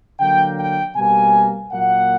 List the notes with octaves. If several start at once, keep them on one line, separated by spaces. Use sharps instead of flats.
D3 F#3 A#3 G5
G5
B2 G3 A#3 G#5
A#2 F#3 A#3 F#5